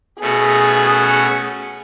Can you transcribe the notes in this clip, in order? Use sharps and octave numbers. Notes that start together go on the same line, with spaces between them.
B2 A3 C#4 F#4 G#4